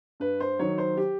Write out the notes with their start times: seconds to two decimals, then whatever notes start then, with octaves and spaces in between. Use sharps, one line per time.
0.20 G2 B4
0.40 C5
0.59 D#3 F#3 C#5
0.78 C5
0.97 G4